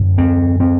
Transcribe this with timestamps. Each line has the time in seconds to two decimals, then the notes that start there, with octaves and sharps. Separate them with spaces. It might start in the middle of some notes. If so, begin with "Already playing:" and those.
Already playing: F#2 D3
0.18 C4
0.60 C4